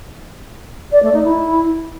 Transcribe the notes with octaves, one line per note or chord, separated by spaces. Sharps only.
D5
A3
D#4
E4